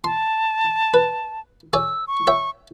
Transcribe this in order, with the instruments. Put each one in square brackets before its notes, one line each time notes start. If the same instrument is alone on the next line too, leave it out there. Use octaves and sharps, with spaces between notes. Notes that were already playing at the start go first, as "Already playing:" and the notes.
[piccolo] A5 [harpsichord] C6
[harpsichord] B4
[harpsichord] G#4 C#5 D5 [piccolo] E6
[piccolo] C#6
[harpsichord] C#5 E5 G5